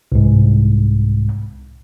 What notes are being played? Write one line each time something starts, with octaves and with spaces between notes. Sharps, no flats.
C2 G#2